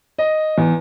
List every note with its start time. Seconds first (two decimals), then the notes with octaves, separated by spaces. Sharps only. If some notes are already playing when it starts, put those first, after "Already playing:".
0.18 D#5
0.58 E2